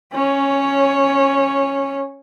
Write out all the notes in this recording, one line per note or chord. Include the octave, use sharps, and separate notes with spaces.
C#4 C#5